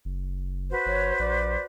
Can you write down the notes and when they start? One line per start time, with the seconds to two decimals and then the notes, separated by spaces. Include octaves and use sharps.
0.05 F#1
0.71 F#4 B4 C5
0.86 G1 C#5
1.19 A#1 D5